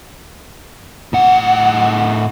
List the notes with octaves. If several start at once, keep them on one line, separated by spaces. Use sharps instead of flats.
A2 F#5